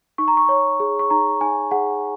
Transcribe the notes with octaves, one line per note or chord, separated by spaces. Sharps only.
D#4 C#6
A#5
C#6
C#5
G#4
C#6
D#4 A#5
D#4 G#5
G#4 F#5